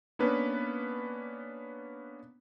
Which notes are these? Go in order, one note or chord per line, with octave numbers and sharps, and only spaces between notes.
A#3 B3 C#4 D4 B4